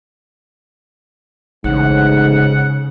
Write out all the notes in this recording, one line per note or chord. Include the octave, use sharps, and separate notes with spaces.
A1 G#2 C#3 F#5